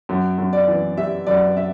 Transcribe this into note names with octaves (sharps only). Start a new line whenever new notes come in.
F#2
F#2
D5
E3
G3 E5
F#2 D5
E5